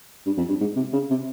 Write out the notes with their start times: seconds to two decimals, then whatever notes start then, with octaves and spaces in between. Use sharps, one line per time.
0.26 G2
0.37 F2
0.48 G2
0.60 G#2
0.76 C3
0.93 C#3
1.10 C3